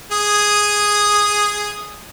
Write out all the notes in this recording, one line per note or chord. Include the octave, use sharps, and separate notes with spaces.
G#4 D#6